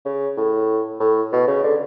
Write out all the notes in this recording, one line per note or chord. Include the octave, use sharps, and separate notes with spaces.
C#3
A2
A2
B2
C#3
D3